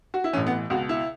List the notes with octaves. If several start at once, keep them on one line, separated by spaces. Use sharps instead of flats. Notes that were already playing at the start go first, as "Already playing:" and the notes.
F#4
E4
A1 A2 E3 C#4
B3
C#2 B2 F#4
E4